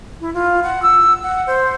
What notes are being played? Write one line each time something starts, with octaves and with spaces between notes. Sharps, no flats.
E4
F4
F#5
E6
F#5
C5